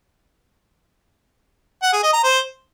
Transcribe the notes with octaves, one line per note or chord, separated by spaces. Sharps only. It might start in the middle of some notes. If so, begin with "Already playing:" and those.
F#5
G#4
D#5
A#5
C5